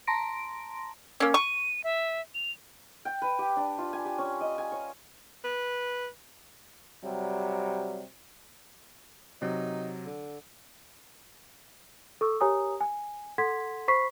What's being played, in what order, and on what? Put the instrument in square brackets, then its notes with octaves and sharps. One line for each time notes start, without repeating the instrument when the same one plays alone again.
[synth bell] A5 A#5 C6 A#6 D7
[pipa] A#3 C#4 [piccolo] E6
[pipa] C#6 [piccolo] D#7
[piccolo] E5
F7
[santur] G5
B4
G4
D4
F4
G#5
G4
C#4
D#5
G#5
C#5
[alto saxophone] B4
[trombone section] C3 F#3 G3
[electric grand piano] C3 F#3 [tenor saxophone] D#4
[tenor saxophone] D3
[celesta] A4 C#6 E6
G4 A#4 C#5 G#5 A#5 D#6
G#5
A4 F#5 C6 G#6 B6
C5 B5 C#6 B6 C7